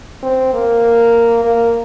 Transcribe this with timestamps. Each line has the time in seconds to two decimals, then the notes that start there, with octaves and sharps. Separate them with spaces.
0.23 C4
0.53 A#3
1.45 A#3